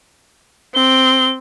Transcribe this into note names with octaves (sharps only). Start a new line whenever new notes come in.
C4 G7